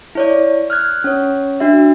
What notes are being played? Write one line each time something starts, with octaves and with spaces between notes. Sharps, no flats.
E4 C#5 D5
F6 F#6 G#6
C#4 C#5
D4 F#4 E5